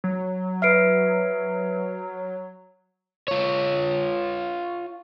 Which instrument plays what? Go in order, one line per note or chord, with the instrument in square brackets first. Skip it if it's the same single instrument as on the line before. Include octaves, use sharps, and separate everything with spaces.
[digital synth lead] F#3
[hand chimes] B4 E5 [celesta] F6 C7 D7
[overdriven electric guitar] F4 C#5